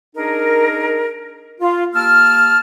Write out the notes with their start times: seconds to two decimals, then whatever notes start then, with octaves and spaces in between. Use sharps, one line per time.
0.16 D4 D#4 G#4 A#4
1.61 F4
1.95 A#3 G4 A5 E6 F6